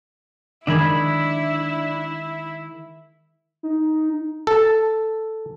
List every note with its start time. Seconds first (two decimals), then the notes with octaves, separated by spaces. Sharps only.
0.67 D#3 G#3 D4 E4 E5 B5 G#6
3.63 D#4
4.47 A4